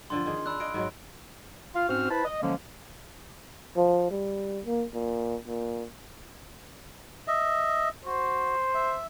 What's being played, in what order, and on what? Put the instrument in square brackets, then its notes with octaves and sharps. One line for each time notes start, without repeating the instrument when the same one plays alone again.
[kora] G2 D3 F3 [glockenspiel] C6
[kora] D#3 G#4
[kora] D4 [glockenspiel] B5 E6 F#6
[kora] G#4 D#5 F5 [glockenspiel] D7
[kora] G#2 F#3 G#3
[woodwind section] F4 F5
G#2 C4 C#4 F#4 C5 F6
E4 B4 C5 A5 B5
D#5
D3 F3 F#3 G#3 A#3 C#4
[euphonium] F3
G3
A#3
A#2
A#2
[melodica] D#5 E5
[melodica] F#4 [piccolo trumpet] C5
[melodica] E5